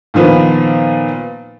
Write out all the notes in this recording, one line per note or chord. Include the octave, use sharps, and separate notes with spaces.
A#2 D#3 F3 B3